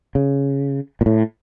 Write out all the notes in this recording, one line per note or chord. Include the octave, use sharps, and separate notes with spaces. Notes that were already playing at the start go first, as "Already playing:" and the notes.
C#3
A#2
A2